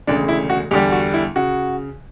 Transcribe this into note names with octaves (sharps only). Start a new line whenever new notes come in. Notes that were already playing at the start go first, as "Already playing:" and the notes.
E1 D2 C#3 D4
E4
F#4
E2 D3 G3 G4
F#4
E4
C#3 F#4